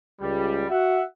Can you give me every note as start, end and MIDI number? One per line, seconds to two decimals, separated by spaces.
0.21 0.64 37
0.21 0.64 55
0.69 1.02 66
0.69 1.02 76
0.69 1.02 78